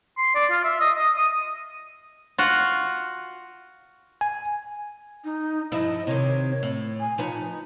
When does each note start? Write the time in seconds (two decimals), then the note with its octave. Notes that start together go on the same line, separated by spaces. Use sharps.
0.18 C6
0.35 D5
0.51 F4
0.64 E5
0.81 D#5
0.97 D#5
1.17 D#6
2.38 F4 F#4
4.21 G#5
5.25 D#4
5.72 G2 F3 E4 D#5
6.07 C3 D#3 C#5
6.63 A2
7.00 G#5
7.18 F3 D#4 B4 C#5